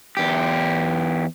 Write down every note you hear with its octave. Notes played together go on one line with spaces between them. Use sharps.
E2 G4